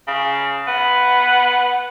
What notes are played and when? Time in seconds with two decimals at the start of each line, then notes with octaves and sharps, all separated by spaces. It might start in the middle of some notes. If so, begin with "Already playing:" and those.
0.07 C#3
0.67 B3